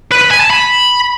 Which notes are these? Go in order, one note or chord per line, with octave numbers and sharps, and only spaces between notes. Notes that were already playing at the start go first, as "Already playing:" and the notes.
B4
B5
G#5
A5
B5